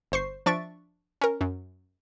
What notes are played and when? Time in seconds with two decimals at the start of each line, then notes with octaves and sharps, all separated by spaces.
0.12 G1 C5 C#6 C7
0.46 F3 D4 E5 C#6 A6 D7
1.21 C#4 A#4
1.41 F#2